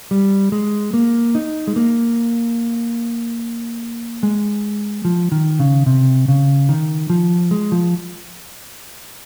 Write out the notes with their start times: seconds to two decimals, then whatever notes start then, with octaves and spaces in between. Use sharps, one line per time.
0.11 G3
0.52 G#3
0.94 A#3
1.35 D#4
1.67 G#3
1.76 A#3
4.23 G#3
5.05 F3
5.32 D#3
5.59 C#3
5.86 C3
6.28 C#3
6.69 D#3
7.10 F3
7.51 G#3
7.72 F3